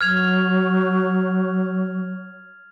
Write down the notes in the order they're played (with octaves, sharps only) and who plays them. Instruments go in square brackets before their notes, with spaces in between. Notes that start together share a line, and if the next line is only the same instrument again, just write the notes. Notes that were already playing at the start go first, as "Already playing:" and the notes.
[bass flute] F#3 [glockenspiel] F6 G#6 F7